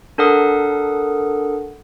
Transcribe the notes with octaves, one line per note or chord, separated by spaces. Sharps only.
D4 A4 A#4 F#5 D#6